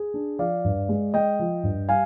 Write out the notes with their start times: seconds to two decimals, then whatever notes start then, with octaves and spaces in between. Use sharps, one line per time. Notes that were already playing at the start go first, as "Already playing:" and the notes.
Already playing: G#4
0.14 D4
0.39 F3 D5 F5
0.65 G2
0.89 G#3
1.14 G#3 D#5 G5
1.39 F3
1.64 G2
1.89 G3 F5 G#5